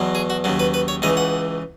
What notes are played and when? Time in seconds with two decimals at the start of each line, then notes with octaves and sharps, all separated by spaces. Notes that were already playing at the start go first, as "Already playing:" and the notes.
Already playing: E2 B2 F#3
0.15 G#4
0.30 F#4
0.44 D#2 C#3 F#3
0.59 B4
0.74 B4
0.88 C#5
1.02 C#2 C#3 E3 D#5
1.17 F#5